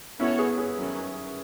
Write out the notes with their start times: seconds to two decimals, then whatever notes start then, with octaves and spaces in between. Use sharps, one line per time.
0.20 B3 C#4 E4 F#4 A4 C#5
0.39 G#4 B4
0.58 G#4 B4
0.77 D#3 F#3 C#4 E4